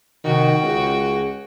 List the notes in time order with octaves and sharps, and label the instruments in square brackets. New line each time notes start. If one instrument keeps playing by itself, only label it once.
[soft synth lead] C3 [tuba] D#3 [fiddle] F#4 G5
[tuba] C#2 [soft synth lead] G#4